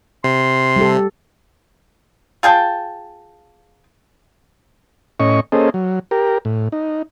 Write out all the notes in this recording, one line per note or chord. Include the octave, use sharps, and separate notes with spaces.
C3 C6
G3 G4 A4
F4 G#4 G5 A5
A2 C#4 D#5 C#6
A#3 C#4 G#4 A4 C5 D#5
F#3
G4 A#4
A2
D#4